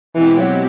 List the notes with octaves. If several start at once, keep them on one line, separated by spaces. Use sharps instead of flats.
B2 E3 G#3 C4 E4 G4
F#3